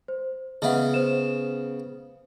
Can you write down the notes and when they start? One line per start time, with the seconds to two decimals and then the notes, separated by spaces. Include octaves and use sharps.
0.08 C5
0.62 C#3 B3 D#5 E5 F#5
0.94 C5 E7